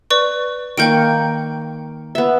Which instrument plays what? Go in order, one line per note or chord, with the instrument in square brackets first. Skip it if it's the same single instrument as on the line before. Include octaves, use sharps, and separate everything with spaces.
[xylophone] B4 D5 C#6
[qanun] D#3 A#3 C#6 [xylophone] G5 G6 D7
[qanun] B3 E5